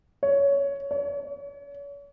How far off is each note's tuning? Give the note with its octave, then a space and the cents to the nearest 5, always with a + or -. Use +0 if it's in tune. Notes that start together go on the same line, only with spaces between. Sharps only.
C#5 +15
C#5 +40